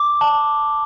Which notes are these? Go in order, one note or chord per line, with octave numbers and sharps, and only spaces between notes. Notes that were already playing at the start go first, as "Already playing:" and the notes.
Already playing: D6
A5